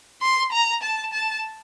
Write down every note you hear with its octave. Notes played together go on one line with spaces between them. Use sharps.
C6
A#5
A5
A5